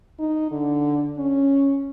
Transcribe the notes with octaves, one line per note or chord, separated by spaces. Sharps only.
D#4
D3
C#4